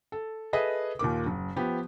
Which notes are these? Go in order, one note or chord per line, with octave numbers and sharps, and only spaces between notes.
A4
G#4 A4 B4 D#5 E5
D#2 A#2 A#3 D6
F#1
F3 B3 G4